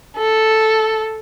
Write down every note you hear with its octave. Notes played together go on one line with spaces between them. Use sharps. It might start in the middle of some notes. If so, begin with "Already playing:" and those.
A4